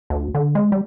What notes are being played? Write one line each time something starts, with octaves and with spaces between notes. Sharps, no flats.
D2
D3
G#3
G3